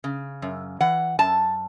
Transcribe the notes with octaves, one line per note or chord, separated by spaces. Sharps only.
C#3
F#2
E3 F#5
F#2 A5